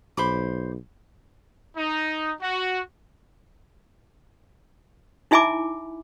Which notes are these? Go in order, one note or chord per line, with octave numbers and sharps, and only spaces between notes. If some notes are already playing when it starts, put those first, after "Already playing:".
B1 C5 B5 D6
D#4
F#4
D#4 E4 E5 G#5 B5 D6